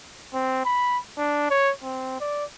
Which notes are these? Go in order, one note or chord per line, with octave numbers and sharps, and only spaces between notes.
C4
B5
D4
C#5
C4
D5